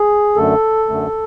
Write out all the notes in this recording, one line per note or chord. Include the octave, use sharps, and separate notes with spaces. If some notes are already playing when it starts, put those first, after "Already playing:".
Already playing: G#4
F#2 D3 A3 A4
F#2 D3 A3